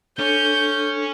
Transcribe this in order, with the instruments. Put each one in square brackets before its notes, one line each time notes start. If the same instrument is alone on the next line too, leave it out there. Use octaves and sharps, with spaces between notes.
[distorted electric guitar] C#4 [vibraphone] D4 A4 [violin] G6